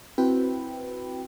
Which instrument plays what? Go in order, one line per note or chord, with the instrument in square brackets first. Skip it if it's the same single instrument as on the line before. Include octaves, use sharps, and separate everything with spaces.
[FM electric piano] C4 E4 F#4 B4 G5 B5